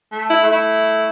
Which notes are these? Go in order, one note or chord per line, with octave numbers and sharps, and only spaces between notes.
A3
E4
A3
E4